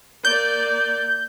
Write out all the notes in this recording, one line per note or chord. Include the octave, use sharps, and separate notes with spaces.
A#3 D5 G6